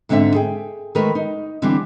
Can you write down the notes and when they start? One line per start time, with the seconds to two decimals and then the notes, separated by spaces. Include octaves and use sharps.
0.09 G#2 D3 C4 D4 E5
0.35 G#4 G5
0.95 D#3 G#3 A3 A#4 B4
1.15 D#4
1.62 D3 E3 G3 C4 D4